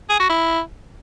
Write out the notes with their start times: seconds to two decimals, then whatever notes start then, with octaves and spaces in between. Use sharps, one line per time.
0.10 G#4
0.20 F#4
0.30 E4